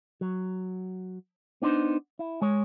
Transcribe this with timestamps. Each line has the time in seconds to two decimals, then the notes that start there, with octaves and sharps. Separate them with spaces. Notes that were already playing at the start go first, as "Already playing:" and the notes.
0.21 F#3
1.62 B3 D4 D#4 C5
2.19 E4
2.42 G#3 C#5